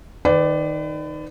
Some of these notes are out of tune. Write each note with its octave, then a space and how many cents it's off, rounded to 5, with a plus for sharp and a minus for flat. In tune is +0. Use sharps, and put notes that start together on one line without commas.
D#3 +0 B4 +35 D5 +0